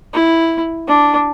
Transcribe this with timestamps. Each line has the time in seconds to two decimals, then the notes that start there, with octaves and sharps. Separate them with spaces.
0.14 E4
0.88 D4